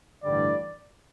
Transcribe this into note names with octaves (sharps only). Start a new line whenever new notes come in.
A1 G2 D3 G3 D5